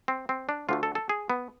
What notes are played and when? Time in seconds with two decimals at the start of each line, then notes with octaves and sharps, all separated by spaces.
0.08 C4
0.29 C4
0.49 D4
0.69 D2 D3 A3 F4
0.83 A4
0.95 A4
1.09 G#4
1.30 B3